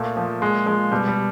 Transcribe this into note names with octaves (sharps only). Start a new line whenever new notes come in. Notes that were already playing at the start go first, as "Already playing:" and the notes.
Already playing: A#2 A3
F3
A#2 G#3
F3 G#3
B2 G3
G3